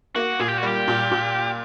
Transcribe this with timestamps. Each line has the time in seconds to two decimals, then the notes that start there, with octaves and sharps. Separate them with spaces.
0.15 A#3 F#4
0.39 A#2 G#4
0.49 G4
0.58 F#4
0.63 G3 G4
0.88 A#2
1.11 A#2